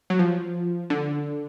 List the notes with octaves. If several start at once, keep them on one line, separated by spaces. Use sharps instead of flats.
F#3
F3
D3